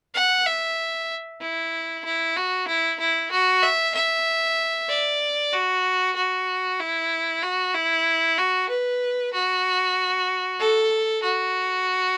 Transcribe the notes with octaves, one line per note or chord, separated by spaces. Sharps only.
F#5
E5
E4
E4
F#4
E4
E4
F#4
E5
E5
D5
F#4
F#4
E4
F#4
E4
F#4
B4
F#4
A4
F#4